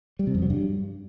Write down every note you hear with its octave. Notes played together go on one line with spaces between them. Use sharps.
G3
C3
F2
F#3
G2